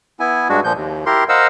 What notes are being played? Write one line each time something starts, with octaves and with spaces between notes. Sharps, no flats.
B3 E4 G#5
G2 G#3 D4 F#4
A#2 F3 G6
D#2
E4 G4 A#4 C6
A#4 C5 D#5 F5 F#5 E6